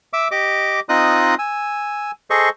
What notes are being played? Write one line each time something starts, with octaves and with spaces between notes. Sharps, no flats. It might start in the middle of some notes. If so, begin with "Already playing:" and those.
E5 D6 E6
G4 D#5 D6
C4 D#4 F4 D#5 D#6 F#6
G#5 E6
G#4 A4 C5 D#5 C#6